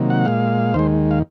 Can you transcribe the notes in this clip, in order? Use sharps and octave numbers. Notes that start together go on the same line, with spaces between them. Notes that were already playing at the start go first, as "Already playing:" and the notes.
Already playing: C3 D#3 F#3 A#3
F#5
A#2 G#3 F5
D#2 D#3 G#3 C5
F5